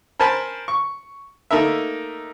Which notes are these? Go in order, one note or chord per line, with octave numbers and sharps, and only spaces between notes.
A#4 C5 G#5 A5 B5
C#6
A3 A#3 D#4 A4 A#4 E5